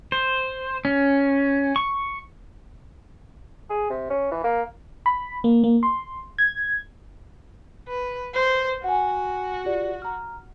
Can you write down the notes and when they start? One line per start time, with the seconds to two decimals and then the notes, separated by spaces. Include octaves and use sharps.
0.12 C5
0.85 C#4
1.76 C#6
3.70 G#4
3.90 C3
4.10 C#4
4.32 E3
4.44 A#3
5.06 B5
5.44 A#3
5.64 A#3
5.83 C6
6.38 G#6
7.88 B4
8.34 C5
8.84 F#4 F#5 G#5
9.65 F4 G4 D5
10.02 A#5 F6